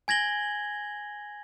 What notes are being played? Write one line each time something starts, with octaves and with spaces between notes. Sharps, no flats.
G#5 G#6 A#6 F#7 G7